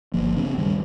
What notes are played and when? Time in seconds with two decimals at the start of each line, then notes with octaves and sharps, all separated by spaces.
0.14 G1 F3 A#3
0.36 C#3 B3 C4 D4
0.57 D2 G2 D#3 G3